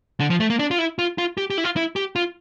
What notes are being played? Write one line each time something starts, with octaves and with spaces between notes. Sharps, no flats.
D3
F3
A3
A#3
D4
F4
E4
F4
F4
G4
G4
E4
F4
E4
G4
F4